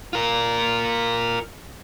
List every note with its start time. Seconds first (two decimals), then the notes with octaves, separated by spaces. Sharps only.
0.13 F4 A#4